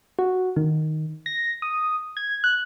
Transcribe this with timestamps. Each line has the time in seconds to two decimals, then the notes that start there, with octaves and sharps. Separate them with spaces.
0.19 F#4
0.56 D#3
1.26 A#6
1.62 D#6
2.17 G#6
2.44 F#6